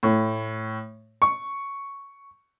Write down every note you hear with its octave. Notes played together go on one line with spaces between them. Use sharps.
A2
C#6